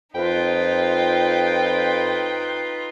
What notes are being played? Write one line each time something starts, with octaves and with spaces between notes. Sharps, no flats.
F2 D#4 F4 B4 G5